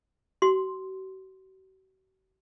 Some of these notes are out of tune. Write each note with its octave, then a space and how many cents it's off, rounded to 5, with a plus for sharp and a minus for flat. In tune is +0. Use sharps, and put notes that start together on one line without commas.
F#4 +40 C6 +0